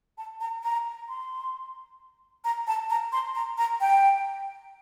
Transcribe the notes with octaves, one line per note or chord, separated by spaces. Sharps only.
A5
A#5
A#5
C6
A#5
A5
A#5
C6
A#5
A#5
G5